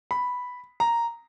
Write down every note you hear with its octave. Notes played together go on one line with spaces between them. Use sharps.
B5
A#5